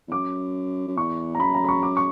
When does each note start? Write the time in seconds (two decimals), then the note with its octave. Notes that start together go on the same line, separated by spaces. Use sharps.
0.08 E2
0.12 F#2 D6
0.88 F#2
0.97 E2 C#6
1.35 A#5
1.40 F#2 B5
1.54 A#5
1.64 B5
1.69 C#6
1.83 D6
1.97 C#6